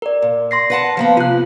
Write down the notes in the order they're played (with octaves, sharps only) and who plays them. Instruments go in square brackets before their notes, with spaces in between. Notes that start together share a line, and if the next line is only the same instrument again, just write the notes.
[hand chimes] A#4 D5
[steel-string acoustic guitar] A#2
[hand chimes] C6 A#6 C7
[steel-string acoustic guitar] B4 F#5 A5
F3 A#3 B3
[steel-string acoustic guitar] C3 [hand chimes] F4 F#6